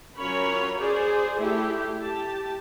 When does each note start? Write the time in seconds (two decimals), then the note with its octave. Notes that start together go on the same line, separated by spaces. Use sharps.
0.17 F#3 C#4 F4 A#4 C#5 B5
0.77 G#4 C5 D5
1.37 A3 E4 G4
2.01 G4 A5